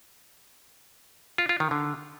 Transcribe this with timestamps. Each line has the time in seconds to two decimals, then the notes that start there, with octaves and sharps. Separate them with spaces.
1.38 F4
1.49 F4
1.60 D#3
1.71 D3